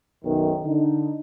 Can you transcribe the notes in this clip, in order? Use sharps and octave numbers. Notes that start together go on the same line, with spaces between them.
B1 F#2 D#3
D3 D#4